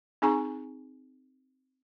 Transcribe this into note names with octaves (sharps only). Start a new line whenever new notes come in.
C4 D#4 G#4 G#5 A#5 C#6